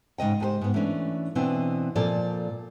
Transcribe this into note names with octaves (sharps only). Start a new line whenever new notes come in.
G#2 C#3 D#5 G5
G#2 G4 G#4 C5
G#2 B3
E3 A3 C#4 D4
B2 E3 B3 C4 D4
A#2 F3 A4 D5